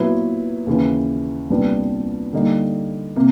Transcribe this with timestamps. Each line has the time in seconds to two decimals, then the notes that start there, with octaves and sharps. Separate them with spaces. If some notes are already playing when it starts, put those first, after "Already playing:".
Already playing: A#2 F#3 B3 E4
0.67 D#2 C#3 E3
1.50 C2 A#2 G3 B3 D4
2.33 D3 G3 A#3 D#4
3.16 C3 A#3